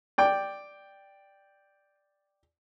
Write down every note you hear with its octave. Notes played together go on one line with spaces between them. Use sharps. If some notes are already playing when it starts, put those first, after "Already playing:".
D5 G5